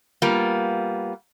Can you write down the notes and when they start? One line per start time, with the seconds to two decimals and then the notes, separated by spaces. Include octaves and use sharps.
0.22 G3 A#3 B3 F4